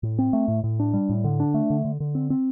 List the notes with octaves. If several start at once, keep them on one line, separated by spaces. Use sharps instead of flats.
A2
C4
A3
A2
A2
D4
G3
A2
D3
D4
A3
D3
D3
D3
C4
C4